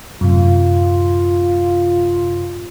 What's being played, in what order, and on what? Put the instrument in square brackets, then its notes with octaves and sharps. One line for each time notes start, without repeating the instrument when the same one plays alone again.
[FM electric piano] F#2 A2 C3 [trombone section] F4